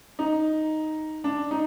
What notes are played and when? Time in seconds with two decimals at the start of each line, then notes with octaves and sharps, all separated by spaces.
0.19 D#4
1.24 D4
1.51 D#4